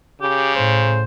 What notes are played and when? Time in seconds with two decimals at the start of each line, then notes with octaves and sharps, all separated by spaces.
0.21 C#3 G4
0.55 A2 C5